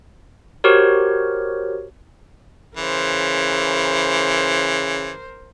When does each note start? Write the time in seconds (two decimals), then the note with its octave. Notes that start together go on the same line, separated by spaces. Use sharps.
0.64 F#4 G4 A#4 C5 C#5
2.77 C#3 E3 A#4 C5